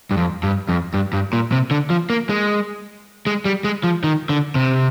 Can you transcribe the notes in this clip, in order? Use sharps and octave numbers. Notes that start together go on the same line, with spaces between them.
G2
F2
G2
F2
G2
G2
A#2
C3
D3
F3
A#3
G#3
G#3
G3
G#3
F3
D#3
D3
C3